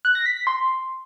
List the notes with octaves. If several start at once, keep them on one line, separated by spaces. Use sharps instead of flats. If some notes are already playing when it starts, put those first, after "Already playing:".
F#6
A#6
B6
B6
C6